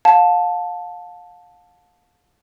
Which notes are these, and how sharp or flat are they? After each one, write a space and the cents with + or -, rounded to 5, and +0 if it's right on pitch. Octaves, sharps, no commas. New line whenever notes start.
F5 +35 A5 +0